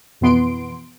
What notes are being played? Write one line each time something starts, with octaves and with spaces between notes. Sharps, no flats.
F2 B2 E3 B3 C6 D7